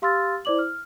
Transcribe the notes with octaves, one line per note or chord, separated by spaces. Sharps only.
G4 F5 C6 E6 F6 A6
E4 C5 D5 D6 F#7
F6